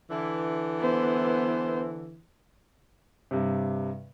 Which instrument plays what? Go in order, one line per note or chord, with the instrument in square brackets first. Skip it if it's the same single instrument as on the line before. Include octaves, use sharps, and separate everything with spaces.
[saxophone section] D3 E3
[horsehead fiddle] B3 C5
[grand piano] G2 C3